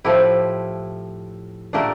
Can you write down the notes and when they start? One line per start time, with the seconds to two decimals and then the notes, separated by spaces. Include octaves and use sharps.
0.04 A2 F3 A3 E4 G4
1.73 A#2 A3 D4 G4 A#4